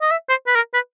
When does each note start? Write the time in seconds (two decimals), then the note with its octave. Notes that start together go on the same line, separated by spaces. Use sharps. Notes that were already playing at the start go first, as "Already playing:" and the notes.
0.01 D#5
0.11 E5
0.29 C5
0.47 B4
0.55 A#4
0.74 B4